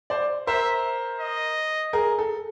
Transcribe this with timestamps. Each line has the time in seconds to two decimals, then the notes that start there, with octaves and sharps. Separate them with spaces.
0.10 C5 D5
0.47 A#4 C5 E5
1.20 D#5
1.93 G#4 A#4
2.18 A4